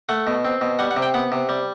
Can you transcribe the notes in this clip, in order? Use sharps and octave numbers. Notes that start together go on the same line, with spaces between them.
A3 F#5
B2
C4
B2
G3 F#5
F#5
C3
G5
B3 F#5
C3
G3